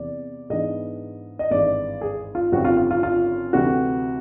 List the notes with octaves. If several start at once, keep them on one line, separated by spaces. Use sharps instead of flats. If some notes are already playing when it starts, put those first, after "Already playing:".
Already playing: E2 C3 E3 D5
G#2 E3 G#3 B3 D4 D#5
D#5
G#1 G2 E3 G#3 D5
G#4
F4
G#1 F#2 D3 G3 C4 F#4
F4
F4
F4
F4
D2 C3 E3 G3 F#4